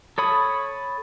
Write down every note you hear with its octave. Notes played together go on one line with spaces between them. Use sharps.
A4 C#5 B5 D#6